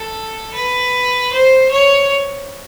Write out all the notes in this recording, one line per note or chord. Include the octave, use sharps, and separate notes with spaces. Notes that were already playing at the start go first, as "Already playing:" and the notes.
Already playing: A4
B4
C5
C#5